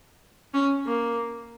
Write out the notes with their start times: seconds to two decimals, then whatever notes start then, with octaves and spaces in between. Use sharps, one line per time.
0.54 C#4
0.86 A#3